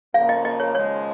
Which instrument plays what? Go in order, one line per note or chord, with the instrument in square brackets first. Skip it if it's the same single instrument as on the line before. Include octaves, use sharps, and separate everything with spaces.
[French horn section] F2 C#3 F3 A#3 [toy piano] F5
[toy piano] D#5
D#5
C#5
[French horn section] D#2 C#3 F3 G#3 [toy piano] C#5